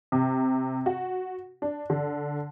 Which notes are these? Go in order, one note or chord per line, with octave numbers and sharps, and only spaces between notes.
C3
F#4
D4
D3